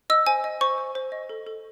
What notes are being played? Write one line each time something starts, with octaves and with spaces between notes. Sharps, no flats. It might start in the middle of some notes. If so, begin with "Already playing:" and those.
D#5 E6
C5 G#5
D#5
C5 C#6
C5
C5
D#5
A4
A4